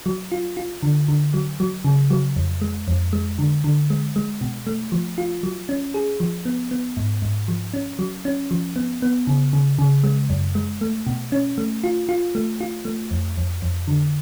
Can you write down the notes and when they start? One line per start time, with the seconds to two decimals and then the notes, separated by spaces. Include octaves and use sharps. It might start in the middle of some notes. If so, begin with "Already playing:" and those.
0.06 F#3
0.32 F4
0.57 F4
0.83 D3
1.08 D3
1.34 F#3
1.60 F#3
1.85 C#3
2.10 F#3
2.36 F2
2.62 G#3
2.88 F2
3.13 G#3
3.39 D3
3.64 D3
3.90 G#3
4.16 G#3
4.41 B2
4.67 A3
4.92 F3
5.18 F4
5.43 F#3
5.69 C#4
5.94 G#4
6.20 F3
6.45 B3
6.71 B3
6.97 G#2
7.22 G#2
7.48 F3
7.74 C#4
7.99 F#3
8.25 C#4
8.51 F3
8.76 B3
9.02 B3
9.27 C#3
9.53 C#3
9.79 C#3
10.04 G#3
10.30 F#2
10.55 G#3
10.81 A3
11.07 B2
11.32 C#4
11.58 A3
11.84 F4
12.09 F4
12.35 A3
12.61 F4
12.85 A3
13.11 F2
13.37 F2
13.62 F2
13.88 D3